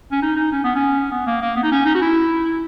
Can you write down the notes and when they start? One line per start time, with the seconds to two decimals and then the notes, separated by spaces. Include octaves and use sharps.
0.12 C#4
0.22 D#4
0.36 D#4
0.52 C#4
0.64 B3
0.75 C#4
1.11 B3
1.27 A#3
1.42 A#3
1.56 B3
1.63 D#4
1.72 C#4
1.85 D#4
1.95 F#4
2.01 E4